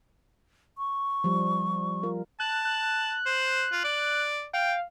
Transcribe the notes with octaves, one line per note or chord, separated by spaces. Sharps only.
C#6
F3 G3
F4 A#4
A5 F#6
F#6
C5
F4
D5
F5 G5